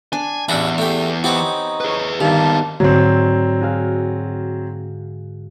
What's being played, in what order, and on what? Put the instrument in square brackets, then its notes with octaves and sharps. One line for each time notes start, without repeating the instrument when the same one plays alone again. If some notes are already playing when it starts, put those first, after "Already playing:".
[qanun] D4 [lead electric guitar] G#5
[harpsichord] A1 D4 E4 [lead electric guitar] E2 [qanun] F#5
[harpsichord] A3 G4
[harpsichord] B3 C4 D6 [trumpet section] D#4 C#5 [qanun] G4 C#6
[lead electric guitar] G#4 B4
[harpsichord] G2 [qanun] D#3 [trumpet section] A#3 A5 [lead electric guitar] B3 G4
[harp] G#2 D3 [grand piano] F#3 C4
[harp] F#4 G#4 F5